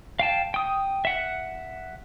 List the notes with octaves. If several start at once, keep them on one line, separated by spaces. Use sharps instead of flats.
F5 G5 A5
G5 D#6
E5 F#5